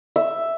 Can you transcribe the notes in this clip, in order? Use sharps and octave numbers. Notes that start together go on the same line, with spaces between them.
E5